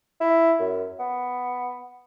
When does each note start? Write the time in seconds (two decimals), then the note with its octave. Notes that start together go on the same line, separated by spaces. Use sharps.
0.20 E4
0.60 F#2
0.99 B3